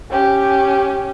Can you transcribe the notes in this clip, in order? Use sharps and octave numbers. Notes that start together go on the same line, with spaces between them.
C#4 G4